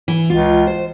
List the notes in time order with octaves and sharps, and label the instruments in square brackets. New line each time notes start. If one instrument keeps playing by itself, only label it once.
[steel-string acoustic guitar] E3
[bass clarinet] C#2 [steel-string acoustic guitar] F4
[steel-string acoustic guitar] C5